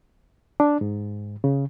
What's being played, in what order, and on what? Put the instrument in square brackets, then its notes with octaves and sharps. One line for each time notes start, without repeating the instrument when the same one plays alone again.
[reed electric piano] D4
G#2
C#3